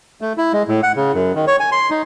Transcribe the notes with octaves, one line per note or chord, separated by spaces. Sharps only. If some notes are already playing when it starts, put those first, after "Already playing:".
A3
E4
G#3
A2
F#5
C#3
F#2
D#3
C#5
G#5
C6
D#4